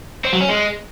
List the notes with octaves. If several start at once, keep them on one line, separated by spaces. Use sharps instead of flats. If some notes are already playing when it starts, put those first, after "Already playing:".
C4
F#3
C#4
G#3